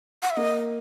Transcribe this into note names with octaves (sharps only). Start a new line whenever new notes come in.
F#5
E5
A#3 D#5